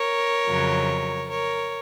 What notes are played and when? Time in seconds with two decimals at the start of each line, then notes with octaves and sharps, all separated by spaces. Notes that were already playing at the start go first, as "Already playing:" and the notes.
Already playing: A#4 C#5
0.47 F2 C#3 F#3
1.30 A#4 C#5